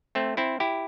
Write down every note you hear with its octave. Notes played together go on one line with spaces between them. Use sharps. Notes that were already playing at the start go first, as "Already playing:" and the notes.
A3 C4
C4 E4
E4 G4